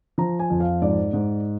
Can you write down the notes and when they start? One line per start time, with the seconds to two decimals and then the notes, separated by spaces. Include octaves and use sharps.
0.18 F3 A#5
0.40 G#5
0.50 F2
0.60 F5
0.82 G#2 D5
1.13 G#2